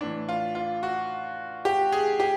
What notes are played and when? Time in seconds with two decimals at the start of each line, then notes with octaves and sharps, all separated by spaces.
0.01 A2 E3 D4
0.29 F4
0.55 F4
0.83 F#4
1.65 G4
1.92 G#4
2.20 G4